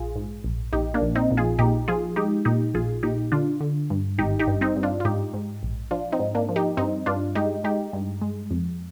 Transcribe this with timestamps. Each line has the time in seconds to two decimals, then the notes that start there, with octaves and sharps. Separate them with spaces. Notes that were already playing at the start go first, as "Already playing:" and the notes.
Already playing: A#1 F4 G#4
0.16 G#2
0.44 A#1
0.73 A#1 D#4 G4
0.94 A#3 D4
1.02 A#1
1.15 C4 D#4
1.31 A#1
1.37 F4 G#4
1.59 A#2 D#4 G4
1.88 F3 F4 G#4
2.16 G#3 D#4 G4
2.45 A#2 D#4 G4
2.74 A#1 F4 G#4
3.03 A#2 D#4 G4
3.32 D3 D4 F4
3.60 D3
3.90 G2
4.18 G#1 D#4 G4
4.39 D#4 G4
4.47 G2
4.61 C4 D#4
4.76 G2
4.83 D4 F4
5.00 F4
5.05 G#2 D#4 G4
5.33 G#2
5.63 A#1
5.91 F3 D4 F4
6.12 C4 D#4
6.20 G#2
6.35 A#3 D4
6.49 F3
6.56 D#4 G4
6.77 G2 C4 D#4
7.06 G2 D4 F4
7.35 G#3 D#4 G4
7.64 G#3 D#4 G4
7.93 G2
8.21 G#3
8.51 F2